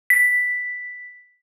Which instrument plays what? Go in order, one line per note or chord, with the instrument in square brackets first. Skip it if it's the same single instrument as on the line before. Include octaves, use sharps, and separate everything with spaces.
[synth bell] B6